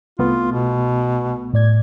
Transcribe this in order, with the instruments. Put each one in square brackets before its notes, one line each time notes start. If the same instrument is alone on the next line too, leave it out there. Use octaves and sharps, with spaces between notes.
[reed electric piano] C2 A3 B3 [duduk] F4
[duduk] B2
[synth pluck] A2 D5 G#6